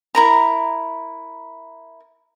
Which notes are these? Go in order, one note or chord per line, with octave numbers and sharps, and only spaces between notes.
E4 A#4 A#5